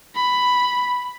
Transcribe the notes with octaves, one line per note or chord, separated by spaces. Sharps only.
B5